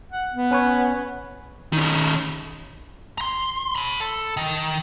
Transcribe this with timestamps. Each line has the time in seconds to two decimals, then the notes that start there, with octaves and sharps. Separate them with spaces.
0.11 F#5
0.33 B3
0.51 C#4 B4 C#5
1.73 D#3 C#4
3.18 A#5 C6
3.76 C#5 B5
4.00 A4
4.37 D#3